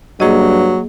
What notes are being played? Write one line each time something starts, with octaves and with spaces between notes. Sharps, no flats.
G2 F#3 A#3 G#4 D#5